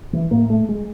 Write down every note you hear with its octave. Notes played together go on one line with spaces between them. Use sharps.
E3
A2 A#3
A3
G#3